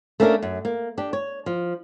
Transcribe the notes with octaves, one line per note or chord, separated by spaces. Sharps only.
A3 A#3 C#4 D4 A#4
F#2
A#3
D4 G4
C#5
F3